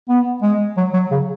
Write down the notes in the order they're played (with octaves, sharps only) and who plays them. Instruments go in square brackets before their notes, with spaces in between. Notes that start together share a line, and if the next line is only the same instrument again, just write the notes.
[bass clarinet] B3
G#3
F#3
F#3
C#3